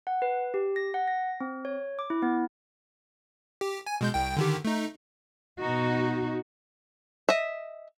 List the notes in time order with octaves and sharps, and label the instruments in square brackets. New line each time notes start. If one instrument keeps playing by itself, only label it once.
[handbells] F#5
B4
G4
A#6
F#5
A#6
C4
C#5
D6
E4
B3
[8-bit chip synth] G4
G#5
B2 G#3 G6
C2 G5
D3 D#3 G4
A3 D#4
[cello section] B2 D#4 F#4
[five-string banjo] D#5 E5